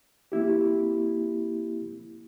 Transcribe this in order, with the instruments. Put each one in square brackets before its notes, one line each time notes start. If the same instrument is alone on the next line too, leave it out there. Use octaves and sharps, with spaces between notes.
[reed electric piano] A#3 C4 E4 G4